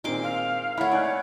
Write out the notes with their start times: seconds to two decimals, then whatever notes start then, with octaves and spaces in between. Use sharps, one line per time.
0.04 A#2 D#3 G#3 C4 C6 D6
0.23 F5
0.77 A3 E4 C#5 E5 F#5 B5 F6
0.91 D#4 D5 G#5 F#6